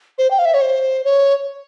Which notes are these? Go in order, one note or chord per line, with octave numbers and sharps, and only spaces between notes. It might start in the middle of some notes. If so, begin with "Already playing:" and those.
C5
G5
F5
E5
C#5
C5
C#5